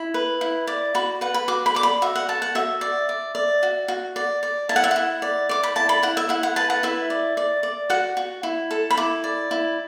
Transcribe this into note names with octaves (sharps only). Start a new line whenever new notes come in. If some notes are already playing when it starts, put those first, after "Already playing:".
Already playing: E4 B5
B4
E4
D5
F#4 B5
B4 F#5
B5
F#4 D6
B5
D5 D6
B5
F#4 E5
F#5
A4 A5
F#5
F#4 E5
D5
D5
D5
F#4
F#4
D5
D5
E4 A5
F#5
E5
E4 F#5
D5
D5 D6
B5
E4 A5
B5
E4 F#5
E5
E4 F#5
F#5
B4 A5
F#5
E4 E5
D5
D5
D5
F#4 F#5
F#4
E4
A4
B5
E4 D6
D5
E4